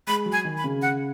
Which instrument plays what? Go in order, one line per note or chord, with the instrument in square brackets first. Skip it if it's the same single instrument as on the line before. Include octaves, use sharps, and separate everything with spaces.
[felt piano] G#3 [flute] B5
[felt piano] F#3
[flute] G#5
[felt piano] D#3
[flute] B5
[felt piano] C#3
[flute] F#5